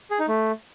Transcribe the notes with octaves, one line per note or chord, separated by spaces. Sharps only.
G#4
D#4
A3